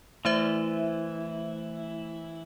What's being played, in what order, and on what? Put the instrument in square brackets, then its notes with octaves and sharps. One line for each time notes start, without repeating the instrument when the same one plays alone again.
[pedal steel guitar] E3 E4 [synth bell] A3 C5 E5